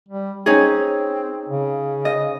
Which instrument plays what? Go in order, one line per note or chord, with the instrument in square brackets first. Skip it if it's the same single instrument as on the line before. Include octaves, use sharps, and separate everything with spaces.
[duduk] G3
[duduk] C4 [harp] C#4 D#4 G#4
[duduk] C#3
[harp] D#5